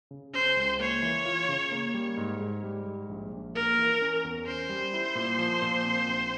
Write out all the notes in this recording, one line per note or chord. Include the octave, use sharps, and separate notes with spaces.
C#3
C#4 C5
C#2
A#3 C#5
E3
F4
C#3
A#3
G3
G#2
G#2
G3
G#2
A#1
A#1
A#3 A#4
E3
C#4
E2
C#4 C5
G3
E4
A#2
F3
A#2
C4
A#1